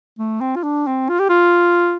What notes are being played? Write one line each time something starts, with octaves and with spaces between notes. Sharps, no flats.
A3
C4
F4
D4
C4
F4
G4
F4